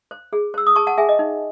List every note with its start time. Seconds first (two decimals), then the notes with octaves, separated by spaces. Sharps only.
0.11 C5
0.33 G#4
0.54 C5 E6
0.67 D#6
0.76 G#4 A5 C#6
0.87 F#5 A5
0.98 G#4 E5 G#5
1.09 D#5
1.19 D#4